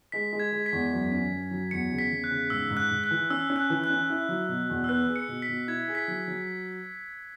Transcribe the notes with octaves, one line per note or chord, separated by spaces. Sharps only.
G#3 B6
G#3
G#6
G#3
B6
E2
F#2
C#4
F#2
F#3
E2 C#7
C#3
B6
E2
F#6
C#3
G#2 E6
G#2
F#6
G#2
F#6
E3
C#4 E6
C#4
F#6
E3
F#6
C#4
E4
F#3
B2
E2
E6
B3 F#6
G#4
C#7
B2
B6
B2
E4 G#6
G#4
B6
F#3
F#3